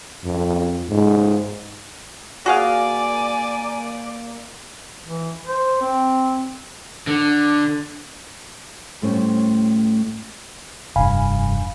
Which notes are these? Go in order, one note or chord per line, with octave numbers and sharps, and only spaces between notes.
F2
G#2
A#3 F#4 G#4 D5 F5 G#5
E3
C5
C4
D3
D2 A2 G3 A3 C#4 C5
F1 G2 F5 G#5 B5